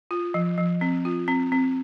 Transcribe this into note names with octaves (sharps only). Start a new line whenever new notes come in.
F4
F3
F3
C4
F4
C4
C4